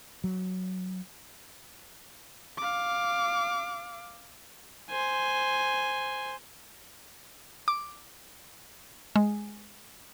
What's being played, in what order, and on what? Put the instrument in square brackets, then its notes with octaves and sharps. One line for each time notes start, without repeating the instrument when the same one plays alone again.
[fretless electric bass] F#3
[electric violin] F5 D6
[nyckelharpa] C5 G#5
[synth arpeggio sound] D6
G#3